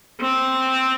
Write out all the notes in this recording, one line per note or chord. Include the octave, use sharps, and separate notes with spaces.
C4